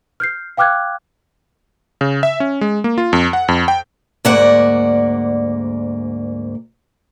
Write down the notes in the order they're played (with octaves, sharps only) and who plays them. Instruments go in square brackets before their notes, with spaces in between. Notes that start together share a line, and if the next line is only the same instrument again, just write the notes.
[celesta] F6 G6 C7
F5 G5 D6 F6 F#6 G#6
[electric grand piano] C#3
E5
C#4
G#3
A#3
F4
F2
F#5
F2
G5
[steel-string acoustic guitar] D2 G#2 A#3 D5 F#5